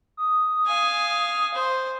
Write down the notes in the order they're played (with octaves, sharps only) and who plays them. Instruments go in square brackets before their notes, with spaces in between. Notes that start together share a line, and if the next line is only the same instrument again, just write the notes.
[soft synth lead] D#6
[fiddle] F5 G#5
C5